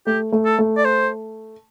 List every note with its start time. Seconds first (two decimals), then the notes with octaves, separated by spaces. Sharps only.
0.07 A3 G4
0.32 A3
0.45 A4
0.59 A3
0.77 D5
0.85 C5